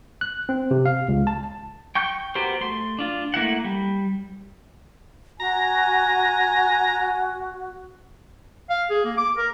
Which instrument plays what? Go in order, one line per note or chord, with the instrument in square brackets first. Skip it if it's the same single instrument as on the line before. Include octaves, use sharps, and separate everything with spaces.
[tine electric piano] F#6
C4
C3
F5
C#2
A5
[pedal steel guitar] G5 C#6 G6
B3 F#4 G4 A#4 C5
A3 C6
D4 F4
A3 A#3 E4 F#5
G3
[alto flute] F#4 [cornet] G#5 [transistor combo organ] A#5
[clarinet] F5
G#4
A#3
D6
A#4